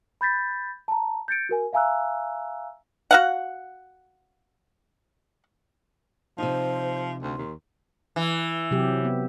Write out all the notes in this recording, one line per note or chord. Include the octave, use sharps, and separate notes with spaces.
B5 G6 A6 B6
A5 A#5
G6 A6 C#7 D7
F#4 A#4 G#5
E5 F5 G#5 A#5 E6 F#6
F#4 F5 F#5
C3 F3 D#4 C5
D2 C6
D#2
E3
C3 F#3 G4
B3